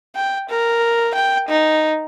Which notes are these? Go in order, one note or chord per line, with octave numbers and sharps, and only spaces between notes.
G5
A#4
G5
D#4